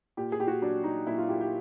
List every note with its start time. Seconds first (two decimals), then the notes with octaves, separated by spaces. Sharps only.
0.17 A#2 G4
0.32 G#4
0.40 A#2 G4
0.47 F#4
0.62 F#3 D4
0.84 F#3 D#4
1.07 A#2 E4
1.18 F4
1.29 A#2 G4
1.41 G4